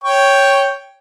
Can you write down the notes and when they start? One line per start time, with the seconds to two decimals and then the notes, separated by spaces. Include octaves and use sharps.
0.04 C#5 G5 C#6